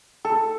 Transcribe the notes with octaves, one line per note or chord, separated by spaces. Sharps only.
A4